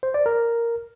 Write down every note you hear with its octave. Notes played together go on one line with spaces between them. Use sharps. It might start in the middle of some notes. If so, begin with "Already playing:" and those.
C5
D5
A#4